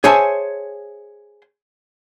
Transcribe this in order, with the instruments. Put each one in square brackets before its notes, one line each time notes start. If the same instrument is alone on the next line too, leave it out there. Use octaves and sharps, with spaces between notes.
[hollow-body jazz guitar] G#4 C5 C#5 E5 G#5 A5